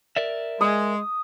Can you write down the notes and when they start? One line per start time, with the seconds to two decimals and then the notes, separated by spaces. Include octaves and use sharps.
0.16 A#4 D5 E5
0.61 G#3 D#6